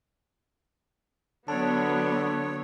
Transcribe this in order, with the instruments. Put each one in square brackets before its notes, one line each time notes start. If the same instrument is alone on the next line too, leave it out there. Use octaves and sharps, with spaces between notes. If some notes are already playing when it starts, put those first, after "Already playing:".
[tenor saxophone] D3 [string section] F#3 B3 [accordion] C#5 [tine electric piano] A5